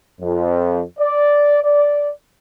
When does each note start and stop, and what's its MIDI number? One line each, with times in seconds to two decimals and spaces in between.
0.20 0.82 41
0.98 1.59 74
1.63 2.11 74